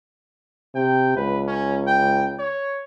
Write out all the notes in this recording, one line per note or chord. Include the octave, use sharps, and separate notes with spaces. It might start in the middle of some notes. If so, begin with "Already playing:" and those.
C3 G5
C#2 B4
C#4
G5
C#5